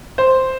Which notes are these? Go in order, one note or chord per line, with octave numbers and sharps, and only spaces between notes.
C5